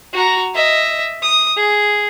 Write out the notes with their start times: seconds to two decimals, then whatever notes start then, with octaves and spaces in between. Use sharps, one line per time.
0.14 F#4 A#5
0.54 D#5 E5
1.22 D#6
1.57 G#4